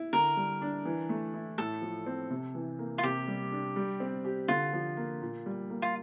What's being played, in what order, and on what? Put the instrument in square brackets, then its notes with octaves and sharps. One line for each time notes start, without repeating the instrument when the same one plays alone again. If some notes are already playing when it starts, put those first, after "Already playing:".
Already playing: [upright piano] E4
[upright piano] D3 [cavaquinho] A#4
[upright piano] G3
D4
E3
A3
E4
[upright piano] A2 [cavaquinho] A4
[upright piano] F3
C4
C3
E3
A#3
[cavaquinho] F4
[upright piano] C3 [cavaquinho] G4
[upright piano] G3
D4
G3
C4
G4
[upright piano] D3 [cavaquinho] F4
[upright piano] F3
A#3
A#2
G3
A#3
[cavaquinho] F4